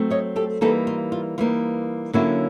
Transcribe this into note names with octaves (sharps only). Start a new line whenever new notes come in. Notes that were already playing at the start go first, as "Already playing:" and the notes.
Already playing: F#3 A3 C4
C#5 D#5
G4 A4
E3 G3 A#3 D#4 G4 A4
F4
F4
E3 G3 A#3 D#4 F4
D3 F#3 A#3 C#4 E4 F#4